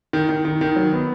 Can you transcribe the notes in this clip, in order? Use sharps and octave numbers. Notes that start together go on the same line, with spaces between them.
D#3
D#3
D#3
D#3
F#3
B3